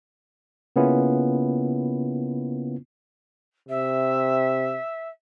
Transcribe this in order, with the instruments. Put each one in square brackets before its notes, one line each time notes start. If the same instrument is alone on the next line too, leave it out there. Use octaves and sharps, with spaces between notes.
[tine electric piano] C#3 A#3 B3 C#4 E4 F4
[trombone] C3 [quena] E5